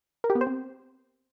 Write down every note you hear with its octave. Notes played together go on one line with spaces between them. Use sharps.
A#4
G4
B3
C5
C4